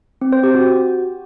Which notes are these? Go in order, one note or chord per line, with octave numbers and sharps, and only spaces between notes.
C4
C5
G4
F#4